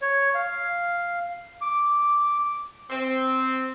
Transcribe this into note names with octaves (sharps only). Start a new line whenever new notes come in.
C#5
F5
D6
C4